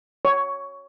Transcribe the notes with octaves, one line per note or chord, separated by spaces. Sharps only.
C#5